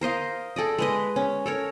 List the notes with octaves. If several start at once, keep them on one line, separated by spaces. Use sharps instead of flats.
A#4 C5 D#5 F5
G#4 A4 D5 D#5
G#3 B4 D#5
C#4
A4 A#4 C#5